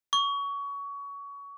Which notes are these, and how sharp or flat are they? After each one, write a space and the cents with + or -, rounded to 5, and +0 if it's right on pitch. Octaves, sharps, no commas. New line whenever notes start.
C#6 +25